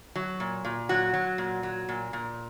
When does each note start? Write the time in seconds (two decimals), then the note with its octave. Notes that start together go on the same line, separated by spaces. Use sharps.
0.16 F#3
0.40 A#2
0.65 A#2
0.89 F#3 F#4
1.14 F#3
1.38 A#2
1.63 F#3
1.89 A#2
2.13 A#2